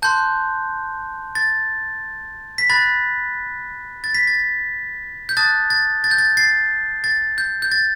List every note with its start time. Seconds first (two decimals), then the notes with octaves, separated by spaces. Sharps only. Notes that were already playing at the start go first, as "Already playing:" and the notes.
0.02 A5 C6 F#6 G6
1.35 A6
2.58 B6
2.70 B5 F#6 A6
4.04 A6
4.14 B6
4.27 A6
5.29 G6
5.37 A5 D#6 F#6 A6
5.70 A6
6.04 A6
6.11 G6
6.18 A6
6.37 A6 C7
7.04 A6
7.38 G6
7.62 G6
7.72 A6